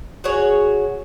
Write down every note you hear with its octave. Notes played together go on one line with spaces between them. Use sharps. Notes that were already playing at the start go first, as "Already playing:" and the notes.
F#4 G#4 C#5 F#5